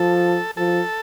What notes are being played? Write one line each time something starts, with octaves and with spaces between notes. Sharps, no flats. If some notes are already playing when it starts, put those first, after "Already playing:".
Already playing: F3 A4
F3 A4